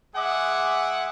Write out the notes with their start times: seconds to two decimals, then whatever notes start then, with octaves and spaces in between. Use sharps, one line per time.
0.16 G#3 G#4 E5 F#5 D6